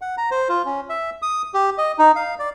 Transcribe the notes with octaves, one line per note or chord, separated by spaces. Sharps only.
F#5
A#5
C5
F4
C#4
E5
D#6
G4
D#5
D#4
F5
D5